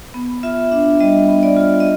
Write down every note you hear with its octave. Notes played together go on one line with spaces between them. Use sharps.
B3
F4 E5
D4 E5
G3 D#5
B3
D5
F4
D#5